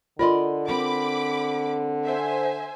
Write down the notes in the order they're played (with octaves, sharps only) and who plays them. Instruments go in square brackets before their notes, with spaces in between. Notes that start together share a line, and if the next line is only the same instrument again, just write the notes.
[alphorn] D3 [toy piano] F4 C6 [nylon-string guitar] A#4 D5 D#5
[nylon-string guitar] C4 A#4 [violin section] B5 D6
[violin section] C5 E5 G#5